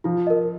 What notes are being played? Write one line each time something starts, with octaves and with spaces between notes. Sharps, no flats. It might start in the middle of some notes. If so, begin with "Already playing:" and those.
F3 F4
A#4 D#5